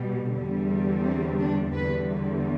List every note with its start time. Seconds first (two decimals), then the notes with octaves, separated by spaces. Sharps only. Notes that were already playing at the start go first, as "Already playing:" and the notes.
Already playing: B2 G3
0.34 E2 D3 G3
1.04 C4
1.39 D4
1.74 E2 D3 G3 B4